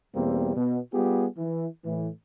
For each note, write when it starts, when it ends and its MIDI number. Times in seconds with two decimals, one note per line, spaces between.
0.15 0.56 40
0.15 0.56 47
0.15 0.56 55
0.15 0.56 58
0.15 0.56 60
0.56 0.80 47
0.94 1.27 55
0.94 1.27 59
0.94 1.27 65
0.94 1.27 67
0.94 1.27 68
1.38 1.68 52
1.85 2.10 45
1.85 2.10 52